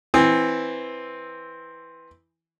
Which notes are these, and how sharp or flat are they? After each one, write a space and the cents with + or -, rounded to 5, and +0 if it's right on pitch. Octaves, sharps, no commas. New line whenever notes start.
E3 +0 C4 +5